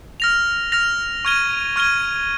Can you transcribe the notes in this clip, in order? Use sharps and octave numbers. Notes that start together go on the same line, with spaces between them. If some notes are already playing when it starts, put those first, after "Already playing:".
F6 A#6 F7
F6 A#6 F7
C#6 F6 G#6 D#7 G7
C#6 F6 G#6 D#7 G7